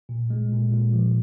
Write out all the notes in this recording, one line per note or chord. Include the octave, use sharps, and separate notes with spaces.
A#2
G#3
A#2
A#2
F3